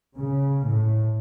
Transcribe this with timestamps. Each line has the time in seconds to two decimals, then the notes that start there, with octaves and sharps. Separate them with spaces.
0.16 C#3
0.65 A2